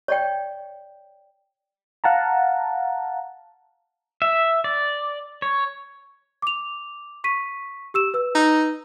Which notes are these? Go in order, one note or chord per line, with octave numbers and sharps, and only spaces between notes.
C#5 D5 G5
F5 F#5 A5 A#5
E5
D5
C#5
D6 F7
C#6 B6 D#7
G4 E6 E7
B4 E6
D#4